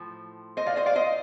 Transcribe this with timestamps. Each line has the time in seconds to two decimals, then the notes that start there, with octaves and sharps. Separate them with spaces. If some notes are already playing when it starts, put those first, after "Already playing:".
Already playing: A2 F3
0.57 C5 D#5
0.66 D5 F5
0.76 C5 D#5
0.86 D5 F5
0.95 C5 D#5